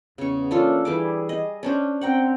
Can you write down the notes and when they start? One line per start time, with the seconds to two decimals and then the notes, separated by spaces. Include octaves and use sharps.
0.18 E2 C#3 C#6
0.51 E3 A#3 C#4 D4 F4 A4
0.85 E3 G3 G#4 D6
1.29 D#5
1.63 C#4 D4 C5
2.01 C4 F#5 G5 A#5